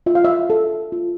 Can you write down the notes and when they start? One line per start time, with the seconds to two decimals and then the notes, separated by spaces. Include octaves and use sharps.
0.06 F4 E5
0.15 F5
0.25 E5
0.50 A4
0.92 F4